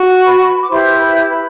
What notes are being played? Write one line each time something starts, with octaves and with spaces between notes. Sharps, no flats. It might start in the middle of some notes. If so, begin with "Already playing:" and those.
Already playing: F#4
B4 B5
D6
E4 G4 B4 C5 C6
B4 B5
B4 B5